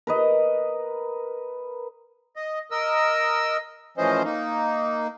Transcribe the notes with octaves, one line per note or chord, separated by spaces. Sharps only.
A#4 B4 D#5
D#5
A#4 D#5 E6
A2 E3 F3 C#4 C5 D#5
A#3 D#4